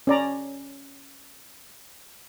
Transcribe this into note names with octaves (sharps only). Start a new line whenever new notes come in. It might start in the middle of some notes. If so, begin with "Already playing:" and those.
C#4 D5 A#5